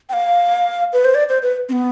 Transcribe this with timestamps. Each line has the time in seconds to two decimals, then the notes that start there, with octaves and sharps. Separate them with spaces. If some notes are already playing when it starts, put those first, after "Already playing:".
0.09 G5
0.13 F5
0.93 B4
1.05 C5
1.15 D5
1.29 C5
1.43 B4
1.69 C4
1.72 B3